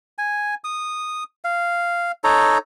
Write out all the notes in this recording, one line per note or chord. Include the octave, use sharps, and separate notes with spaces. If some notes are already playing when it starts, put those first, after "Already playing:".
G#5
D#6
F5
D#4 A4 C#5 A#5